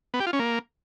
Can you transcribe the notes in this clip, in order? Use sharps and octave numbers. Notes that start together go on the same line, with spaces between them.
B3
G4
F4
C#4
A#3